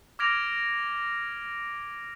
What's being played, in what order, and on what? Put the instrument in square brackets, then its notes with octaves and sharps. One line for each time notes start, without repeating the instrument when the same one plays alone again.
[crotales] D6 F6 G#6 A#6 D7 F7